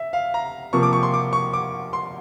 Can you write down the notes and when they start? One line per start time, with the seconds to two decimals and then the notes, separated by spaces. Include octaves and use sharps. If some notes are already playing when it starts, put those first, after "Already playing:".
Already playing: E5
0.13 F5
0.34 A#5
0.73 C3 F3 A#3 C#6
0.83 D6
0.93 C#6
1.03 C6
1.14 D6
1.33 C#6
1.53 D6
1.93 C6